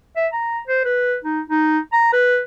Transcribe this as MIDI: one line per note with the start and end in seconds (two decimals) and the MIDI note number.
0.17 0.28 76
0.33 0.59 82
0.68 0.81 72
0.85 1.16 71
1.24 1.41 63
1.50 1.79 63
1.93 2.09 82
2.13 2.41 71